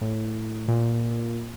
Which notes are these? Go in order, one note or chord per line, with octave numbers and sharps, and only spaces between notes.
A2
A#2